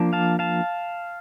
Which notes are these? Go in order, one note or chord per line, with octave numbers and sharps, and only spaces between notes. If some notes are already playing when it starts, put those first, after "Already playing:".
Already playing: F3 A#3 D4
F5 A5
F5 A5